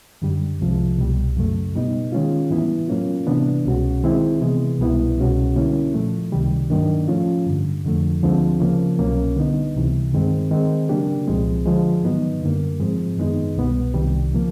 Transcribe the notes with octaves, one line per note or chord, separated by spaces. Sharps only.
F#2 D3 G3
C2 C3 F3 G#3
C2 B2 G3
F#2 C#3 F#3 A3
B2 G3 B3 D#4
D#3 G#3 C#4 F4
A2 E3 G3 B3 E4
A2 F#3 A#3 C#4 F4
C3 E3 G3 B3 D4
C2 B2 G#3 C#4 F#4
D#3 G#3 C4 E4
C3 E3 G#3 B3
C2 B2 G3 B3 E4
C2 B2 G#3 C#4 F#4
D3 G3 A#3 C#4 E4
A#2 F3 A3
C#2 C3 D#3 G3
G2 D#3 F#3 A#3 D4
A2 F3 A3 C#4 F4
G2 D3 G3
F2 D3 F3 A3
D2 D3 F3 G#3 C4
C#3 F3 A#3
C2 B2 F#3 A#3 C#4
D3 G3 B3 D#4
C#2 C3 E3 G3
G2 D#3 G#3 C4
D#3 G#3 C4 D#4
C#3 F#3 A#3 D4 G4
C2 A#2 F3 G#3 C4
D3 F3 G#3
G#2 D#3 F#3 B3 D#4
F#2 D3 G3 A#3
G#2 F3 G#3 C4
F#2 D#3 G#3 B3 D#4
C2 B2 G3 B3
C2 C3 D#3 G3
C#3 F3 A#3